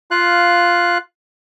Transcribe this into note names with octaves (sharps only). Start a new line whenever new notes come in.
F4 F5 F#6